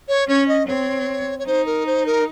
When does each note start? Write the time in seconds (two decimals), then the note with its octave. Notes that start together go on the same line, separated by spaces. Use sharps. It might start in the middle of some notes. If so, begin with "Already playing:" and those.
0.09 C#5
0.28 C#4 C#5
0.48 D#5
0.67 C4 C#5
1.39 C#5
1.47 D#4 C5
1.66 A#4
1.86 C5
2.06 A#4